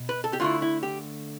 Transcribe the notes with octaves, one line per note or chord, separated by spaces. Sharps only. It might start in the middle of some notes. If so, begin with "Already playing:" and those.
Already playing: B2
B4
A4
G4
D3 A3 E4 F4
E4
G4